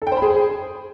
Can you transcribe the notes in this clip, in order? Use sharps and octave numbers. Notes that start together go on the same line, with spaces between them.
A4
G5
C5
B5
G#4